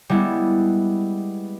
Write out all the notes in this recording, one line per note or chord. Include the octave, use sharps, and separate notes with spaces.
G3 G#3 B3 E4